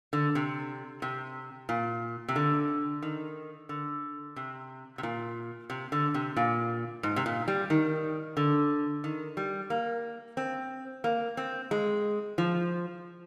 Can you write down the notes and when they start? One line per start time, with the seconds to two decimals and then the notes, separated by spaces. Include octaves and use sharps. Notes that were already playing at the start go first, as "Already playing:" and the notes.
0.13 D3
0.35 C3
1.02 C3
1.69 A#2
2.28 C3
2.36 D3
3.03 D#3
3.69 D3
4.36 C3
4.98 C3
5.03 A#2
5.70 C3
5.92 D3
6.14 C3
6.37 A#2
7.03 G#2
7.16 C3
7.26 A#2
7.48 G3
7.70 D#3
8.37 D3
9.04 D#3
9.37 G3
9.70 A#3
10.37 C4
11.04 A#3
11.37 C4
11.71 G#3
12.38 F3